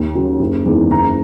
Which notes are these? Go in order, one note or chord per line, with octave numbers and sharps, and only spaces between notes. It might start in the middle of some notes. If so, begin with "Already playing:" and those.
Already playing: D#2
C#3 F#3
F#1
E2 D#3 G#3
F#1 A#5